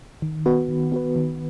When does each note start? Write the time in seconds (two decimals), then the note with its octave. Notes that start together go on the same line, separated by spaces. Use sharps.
0.22 D#3
0.46 B3 F#4 B4
0.69 D#3
0.92 B3 F#4 B4
1.16 D#3